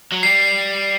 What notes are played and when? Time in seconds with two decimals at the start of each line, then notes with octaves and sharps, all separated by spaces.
0.12 F#3
0.23 G3 C7